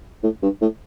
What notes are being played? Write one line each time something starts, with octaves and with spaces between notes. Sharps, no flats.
A2
G2
A2